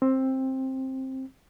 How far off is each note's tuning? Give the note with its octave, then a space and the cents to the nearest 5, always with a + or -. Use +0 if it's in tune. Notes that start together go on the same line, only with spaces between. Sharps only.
C4 +15